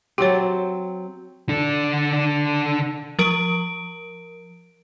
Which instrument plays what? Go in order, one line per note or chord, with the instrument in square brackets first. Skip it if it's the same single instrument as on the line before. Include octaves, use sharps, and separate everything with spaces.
[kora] F#3 C4 [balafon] G4 C#5
[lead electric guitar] D3 D4
[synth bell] F3 A#4 D7